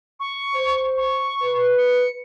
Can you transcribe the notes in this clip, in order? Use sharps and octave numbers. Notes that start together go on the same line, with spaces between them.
C#6
C5
C#6
B4
C#7